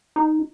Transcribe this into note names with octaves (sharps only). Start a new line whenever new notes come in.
D#4